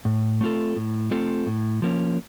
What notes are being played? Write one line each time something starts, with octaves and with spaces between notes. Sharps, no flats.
A2
A3 C4 F4 A4
A2
A3 C4 F4 A4
A2
F3 A#3 C#4